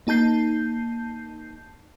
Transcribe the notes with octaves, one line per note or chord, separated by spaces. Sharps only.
A#3 D#4 A5 G6 C7